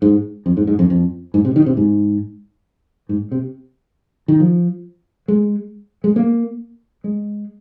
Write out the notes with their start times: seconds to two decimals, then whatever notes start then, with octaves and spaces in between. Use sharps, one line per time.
0.02 G#2
0.46 F2
0.57 G#2
0.67 G#2
0.79 F2
0.90 F2
1.34 G#2
1.45 C3
1.56 D#3
1.66 C3
1.77 G#2
3.09 G#2
3.32 C3
4.28 D#3
4.40 F3
5.28 G#3
6.04 G#3
6.16 A#3
7.04 G#3